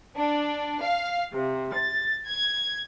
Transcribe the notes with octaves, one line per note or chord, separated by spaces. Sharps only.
D4
F5
C3
A6
G#6